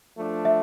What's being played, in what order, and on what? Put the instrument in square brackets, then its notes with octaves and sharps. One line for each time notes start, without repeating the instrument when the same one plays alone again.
[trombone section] F3 A3 D4
[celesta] E5